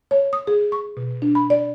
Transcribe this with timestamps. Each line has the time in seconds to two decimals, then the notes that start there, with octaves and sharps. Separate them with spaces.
0.11 C#5
0.33 D#6
0.47 G#4
0.72 C#6
0.97 B2
1.22 D4
1.35 B5
1.50 D5